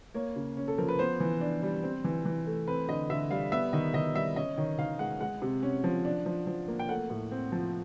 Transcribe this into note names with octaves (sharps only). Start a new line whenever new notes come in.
A#3 C#5
C#3
C#4
A4
F3 A#4
B4
B3 C5
E3
D4
G3
C4
E3
E3
A3
C4 B4
D3 D#5
D3 E5
G3 F5
B3 E5
D#3 D#5
D#3 D#5
G3 E5
C#4 D#5
D#3 C#5
D#3 F5
G#3 F#5
G#3 F#5
C3
C#4
F3
D4
F3
F3
A#3
G5
A3 F#5
A2
C4
F3